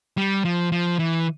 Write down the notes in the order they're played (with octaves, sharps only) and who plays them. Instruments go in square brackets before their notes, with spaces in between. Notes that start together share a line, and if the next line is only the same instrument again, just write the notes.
[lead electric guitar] G3
F3
F3
E3